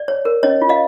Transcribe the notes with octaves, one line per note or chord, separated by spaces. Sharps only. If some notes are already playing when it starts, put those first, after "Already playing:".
Already playing: D5
C#5
A#4
C#4 C#5 D#5
F4
D#5 F5